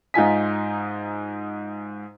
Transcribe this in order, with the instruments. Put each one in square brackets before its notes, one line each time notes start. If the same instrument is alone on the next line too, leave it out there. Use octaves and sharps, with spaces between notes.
[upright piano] G#2 D#4 F4 G#5 B6